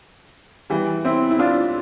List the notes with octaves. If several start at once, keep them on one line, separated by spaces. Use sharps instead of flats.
E3 G3
C4 E4
E4
D4 F4